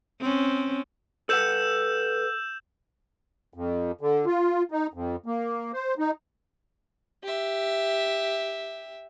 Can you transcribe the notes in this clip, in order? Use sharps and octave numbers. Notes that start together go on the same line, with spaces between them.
C4 C#4
A4 B4 F#5 E6 G6 E7
F2
D3
F4
D#4
F2
A#3
C5
D#4
G4 E5